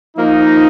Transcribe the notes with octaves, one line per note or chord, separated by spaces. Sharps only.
F3 A#3 D#4